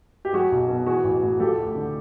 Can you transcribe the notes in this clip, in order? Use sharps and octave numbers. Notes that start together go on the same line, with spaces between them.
G4
F#3 F#4 G#4
B1
B2
E3 F#4 G#4
A1
A2
F3 G4 A4
D2
D3